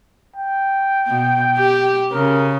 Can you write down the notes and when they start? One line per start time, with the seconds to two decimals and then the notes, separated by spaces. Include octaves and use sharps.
0.36 G5
1.07 B2
1.58 G4
2.12 C#3 A#4